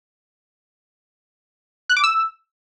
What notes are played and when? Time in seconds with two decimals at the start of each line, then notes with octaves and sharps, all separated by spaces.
1.89 F#6
1.97 D6
2.04 E6